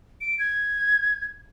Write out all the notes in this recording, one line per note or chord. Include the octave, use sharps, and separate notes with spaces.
D7
G#6